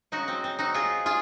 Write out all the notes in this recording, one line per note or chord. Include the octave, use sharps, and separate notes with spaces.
C#3 F#3 D#4 F#4
C4
C4
D#4 F#4
F4 G#4
F4 G#4